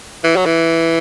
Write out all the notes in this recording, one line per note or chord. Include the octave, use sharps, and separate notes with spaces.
E3
F#3
E3